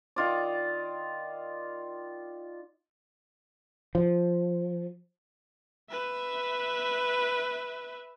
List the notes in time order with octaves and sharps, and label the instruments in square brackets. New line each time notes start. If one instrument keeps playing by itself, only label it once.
[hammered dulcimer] D#3 F4 D5
[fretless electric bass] F3
[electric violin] B4 E5